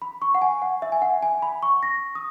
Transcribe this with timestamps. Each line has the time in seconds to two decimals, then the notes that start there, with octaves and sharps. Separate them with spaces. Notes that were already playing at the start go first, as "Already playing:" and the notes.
0.02 B5
0.22 C#6
0.35 F#5
0.42 G#5
0.62 F#5
0.82 E5
0.92 G#5
1.02 F#5
1.23 G#5
1.42 B5
1.63 C#6
1.83 A#6
2.15 D#6